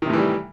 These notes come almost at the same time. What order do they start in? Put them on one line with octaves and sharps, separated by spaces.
D#3 C3 A2 E3 G3